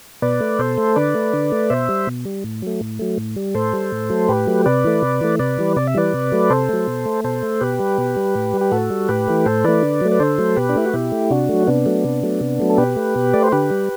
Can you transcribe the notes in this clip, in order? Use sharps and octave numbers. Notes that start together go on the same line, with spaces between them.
B2 B4 D5
A3
B2 A4 C5
A3
D3 B4 D5
A3
D3
A3
B2 C5 E5
G3
B2
G3
A2
F#3 A3
A2
F#3 A3
A2
G3
A2 A4 C5
G3
A2
F#3 A3
A2 G4 B4
F#3 A3
C3 B4 D5
E3 A3
C3
E3 A3
C3 B4 D5
E3 G3
C3 D5
E5
E3 G3 B4 D5
C3
F#3 A3
C3 A4 C5
F#3 A3
B2
A3
B2 A4 C5
A3
B2 G4 B4
G3
B2
G3
A2
G3
G4
A2 F#4 A4
G3
A2 G4 B4
E3 A3
A2 A4 C5
E3 A3 B4 D5
D3
F#3 A3
B4
D3 A4 C5
F#3 A3
B2 G4 B4
D4
A3 E4
F#4
B2 E4 G4
A3
C3 D4 F#4
F#3 A3
C3 B3 D4
F#3 A3
C3
F#3 A3
C3
F#3 A3
A4
B2 G4 B4
A3
B2
A3 D5
C5
D3 G4 B4
G3